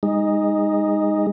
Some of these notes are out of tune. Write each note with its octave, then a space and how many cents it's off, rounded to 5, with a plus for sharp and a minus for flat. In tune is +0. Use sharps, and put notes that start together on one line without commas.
G#3 -30 D#4 +0